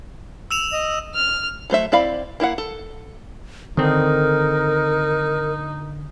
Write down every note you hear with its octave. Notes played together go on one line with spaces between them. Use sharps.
E6 E7 F7
D#5
F6
F#3 A3 C5 E5
C4 E4 D5 F5 B5
A#3 E4 F5 F#5
A4
D3 D#3 C4 D#4 A#4